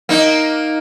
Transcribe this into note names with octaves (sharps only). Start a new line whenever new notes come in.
A#3 D#4